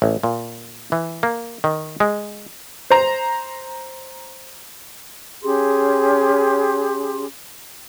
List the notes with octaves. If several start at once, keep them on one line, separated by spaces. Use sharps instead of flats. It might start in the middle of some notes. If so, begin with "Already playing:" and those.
A1
A#2
E3
A#3
D#3
G#3
C5 A#5
C#4 G4 G#4 C6